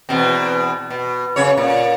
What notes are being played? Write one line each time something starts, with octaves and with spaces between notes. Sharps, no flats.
E2 B2 C4
B2
F#2 C#3 C#5
A#2